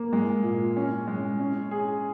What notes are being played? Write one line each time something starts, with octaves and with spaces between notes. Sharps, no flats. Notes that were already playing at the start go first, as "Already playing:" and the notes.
Already playing: A#3
G#3
A#2
C#4
G#3
C#4
G#4